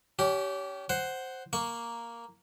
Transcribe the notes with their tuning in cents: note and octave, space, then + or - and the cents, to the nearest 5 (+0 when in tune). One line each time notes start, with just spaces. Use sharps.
C#4 +30 G4 -20
C5 +0 F#5 +10
A#3 +0 C#6 +0